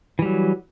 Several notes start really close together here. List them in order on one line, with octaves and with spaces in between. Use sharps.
E3 G3 F#3